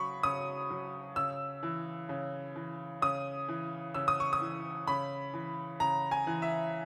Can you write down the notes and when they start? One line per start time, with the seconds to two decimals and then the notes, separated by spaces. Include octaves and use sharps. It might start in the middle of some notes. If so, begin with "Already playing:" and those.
Already playing: C#3 F#3 B5 C#6
0.23 C#3 D#6
0.70 F#3
1.16 C#3 E6
1.63 E3
2.09 C#3
2.56 E3
3.02 C#3 D#6
3.49 E3
3.94 C#3 E6
4.08 D#6
4.20 C#6
4.33 D#6
4.41 E3
4.88 C#3 B5
5.34 E3
5.80 C#3 A#5
6.11 G#5
6.27 E3
6.42 E5